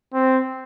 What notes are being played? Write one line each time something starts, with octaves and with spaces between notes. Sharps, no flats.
C4